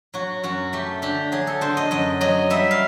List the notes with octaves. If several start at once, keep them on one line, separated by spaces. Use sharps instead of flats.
F#3 F#4
F#2 F#4
A3 G4
D3 G4
F#3 G#4
A4
D3 C5
D#5
F#2 D#5
F#3 D#5
G3 E5
F5